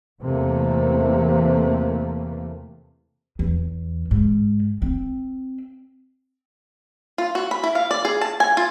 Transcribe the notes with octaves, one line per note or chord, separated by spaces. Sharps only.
E2 C3 E3 A3 A#3
E2
G#2
C4
F4
F#4
B5
E4
F5
D5
G#4
A5
G#5
F4